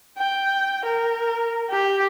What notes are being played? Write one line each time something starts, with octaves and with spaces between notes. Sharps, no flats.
G5
A#4
G4